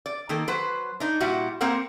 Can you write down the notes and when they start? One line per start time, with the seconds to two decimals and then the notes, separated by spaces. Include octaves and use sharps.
0.06 D5
0.29 D#3 A#3 A4
0.48 F#3 B4 C5
1.00 D4 D#4
1.21 A#2 G3 E4 F#4
1.61 A#3 C4 A#4 C5 F#5